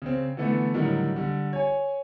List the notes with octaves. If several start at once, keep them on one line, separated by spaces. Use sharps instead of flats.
C#3 C4
D3 E3 A3 B3
A2 D3 D#3 F#3 G3
D3 G3
C#5 G#5